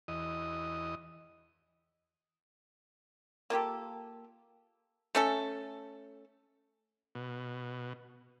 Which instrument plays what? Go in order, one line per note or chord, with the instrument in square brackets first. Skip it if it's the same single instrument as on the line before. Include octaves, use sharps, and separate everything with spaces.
[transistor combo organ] E2 D#5
[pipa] A#3 F4 G4 A4
A3 C#4 A4
[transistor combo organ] B2